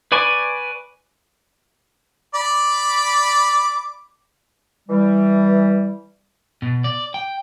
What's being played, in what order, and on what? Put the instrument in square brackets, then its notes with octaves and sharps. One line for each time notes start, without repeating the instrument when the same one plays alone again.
[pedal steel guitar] B4 D5 G#5 B5 C#6
[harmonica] D5 B5 D6
[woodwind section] E3 G3
[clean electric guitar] B2
D5
G5